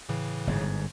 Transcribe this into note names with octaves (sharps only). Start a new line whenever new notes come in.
A2 C#3 E3
G1 G#2